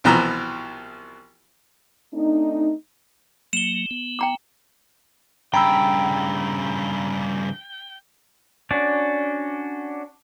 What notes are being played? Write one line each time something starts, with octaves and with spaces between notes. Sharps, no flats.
C2 B2 E3 F3 A#5
A3 C4 D4 D#4
F#3 A#3 E7 G7
B3
G5 A#5 D6
G2 C#3 G5 A#5 B5 E6
C#4 D4 F#4 D5